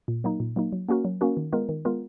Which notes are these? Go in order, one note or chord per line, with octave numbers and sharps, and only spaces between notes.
A#2
F#3 A#3 D#4
A#2
F#3 A#3 D#4
F#3
A#3 C#4 F#4 A#4
F#3
A#3 C#4 F#4 A#4
D#3
G#3 B3 F4 A#4
D#3
G#3 B3 F4 A#4